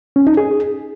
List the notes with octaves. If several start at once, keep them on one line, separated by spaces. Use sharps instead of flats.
C#4
D#4
G#4